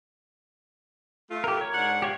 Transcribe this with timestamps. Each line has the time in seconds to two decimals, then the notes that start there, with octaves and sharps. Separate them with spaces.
1.31 A3 F4
1.44 G4 A#4
1.57 A#4 C#5
1.74 G#2 D4 F#5
2.02 G4 C#5 F5